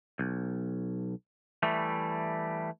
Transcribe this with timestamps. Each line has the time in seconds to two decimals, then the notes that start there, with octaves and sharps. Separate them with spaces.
0.19 B1
1.63 E3 G3 A3